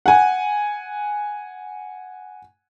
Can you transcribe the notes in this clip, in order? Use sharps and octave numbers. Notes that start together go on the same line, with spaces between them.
F#5 G#5